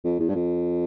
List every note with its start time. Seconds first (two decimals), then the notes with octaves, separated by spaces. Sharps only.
0.04 F2
0.19 E2
0.29 G2
0.35 F2